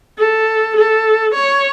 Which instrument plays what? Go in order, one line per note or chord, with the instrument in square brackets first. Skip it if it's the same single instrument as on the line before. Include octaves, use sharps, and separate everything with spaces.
[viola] A4
A4
C#5